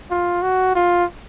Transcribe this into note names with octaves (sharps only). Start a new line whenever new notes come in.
F4
F#4
F4